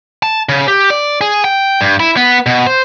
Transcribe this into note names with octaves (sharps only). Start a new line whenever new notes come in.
A5
C#3
G4
D5
G#4
G5
G2
E4
B3
B2
C5